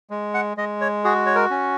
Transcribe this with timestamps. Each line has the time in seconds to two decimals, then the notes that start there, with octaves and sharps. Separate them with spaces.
0.10 G#3
0.34 F#5
0.57 G#3 D#5
0.81 C#5
1.04 F#4 G#4
1.26 C#5
1.35 A#4
1.51 C#4